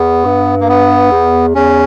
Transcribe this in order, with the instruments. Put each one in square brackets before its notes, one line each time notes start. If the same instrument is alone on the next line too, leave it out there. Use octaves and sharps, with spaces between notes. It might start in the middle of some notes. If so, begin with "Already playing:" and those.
Already playing: [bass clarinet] E2 [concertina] B3
[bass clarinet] G2
[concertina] A#3
B3
[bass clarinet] E2
[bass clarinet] E2 [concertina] C#4